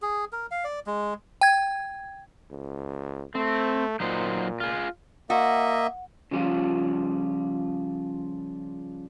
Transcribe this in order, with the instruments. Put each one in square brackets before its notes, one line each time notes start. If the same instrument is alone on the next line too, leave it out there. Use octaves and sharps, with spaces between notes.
[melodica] G#4
A#4
F5
D5
G#3
[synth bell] G5 G#6
[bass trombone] C#2
[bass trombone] A3 [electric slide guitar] C4
[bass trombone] A#2 [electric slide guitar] F#3 D#4 C5
[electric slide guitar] F4 G#4
[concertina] A#3 D#5 E5 [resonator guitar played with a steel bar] F#4
[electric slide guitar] C#3 F3 G3 F4 C5